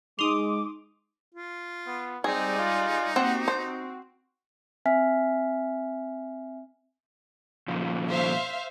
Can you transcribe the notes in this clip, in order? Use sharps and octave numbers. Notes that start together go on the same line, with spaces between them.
G#3 D#4 C6 D6 D#6 F7
F4
B3
G3 G#3 C4 D#4 G#4 D5
F4
A#3 C4 F#4 G4 F#5
C4 F#4 C5
C4 E5 G#5 F6 B6
A#2 C#3 F3
C5 E5 F5